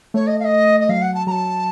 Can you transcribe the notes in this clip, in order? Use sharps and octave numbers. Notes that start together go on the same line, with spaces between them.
A3 C#5
D#5
F5
D#5
D#5
F#3 F5
F#5
A5
F#3 A5 A#5